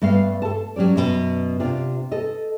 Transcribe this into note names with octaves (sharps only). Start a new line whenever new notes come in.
G2 A3 B3 F5
A4 A5
F#3 C#4 G4 D5
F#2 B2
C3 D4 F4
A4 D#5